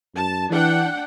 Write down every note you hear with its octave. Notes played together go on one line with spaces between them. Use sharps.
F#2 A5
E3 D4 F#5 G5